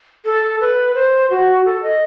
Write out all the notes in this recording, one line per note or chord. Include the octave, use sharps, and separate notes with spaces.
A4
B4
C5
F#4
A4
D#5